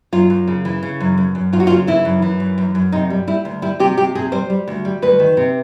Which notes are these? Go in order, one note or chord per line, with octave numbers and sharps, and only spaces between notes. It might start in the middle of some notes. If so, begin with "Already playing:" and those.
F#2 F4
F#2
C#3
E3
C#3
F#2
F#2
F#2
F#2 F4
F#4
F4
C#3
E3 E4
F#2
E3
F#2
F#2
F#2
C3 D#4
G3
G3 E4
D2
G3 E4
C3 G4
C3 G4
C3 G#4
G3 C5
G3
D2
G3
D2 B4
D#3
C3